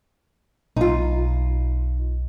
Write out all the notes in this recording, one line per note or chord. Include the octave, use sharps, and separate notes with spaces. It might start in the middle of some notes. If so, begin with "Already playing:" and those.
B1 D#4 F4